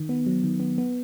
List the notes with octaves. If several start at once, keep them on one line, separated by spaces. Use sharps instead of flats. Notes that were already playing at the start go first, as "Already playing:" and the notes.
Already playing: D#3
B3
F#3
D#3
B3
B3